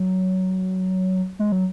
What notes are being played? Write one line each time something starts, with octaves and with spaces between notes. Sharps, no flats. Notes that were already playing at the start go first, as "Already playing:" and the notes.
Already playing: F#3
G#3
F#3